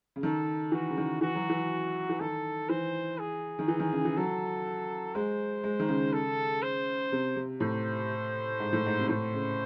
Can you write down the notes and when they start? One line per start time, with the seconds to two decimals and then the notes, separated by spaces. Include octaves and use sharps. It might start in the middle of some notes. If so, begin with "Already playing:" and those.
0.16 C#3
0.23 D#3 A4
0.72 E3 F#4
0.89 C#3
0.97 D#3
1.21 E3 F#4
1.35 F#3
1.49 E3
2.09 E3
2.20 D#3 A4
2.69 E3 C5
3.19 G#4
3.59 D#3
3.68 E3
3.80 D#3
3.92 C#3
4.05 E3
4.17 F#3 A4
5.15 G#3 C5
5.64 G#3
5.80 D#3
5.89 C#3
6.13 A4
6.63 C5
7.12 C3
7.36 C3
7.60 A2 C5
8.60 G#2
8.73 A2
8.86 G#2
8.99 C3
9.09 A2 C5
9.33 C#3